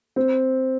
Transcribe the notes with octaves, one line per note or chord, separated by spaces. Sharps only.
C4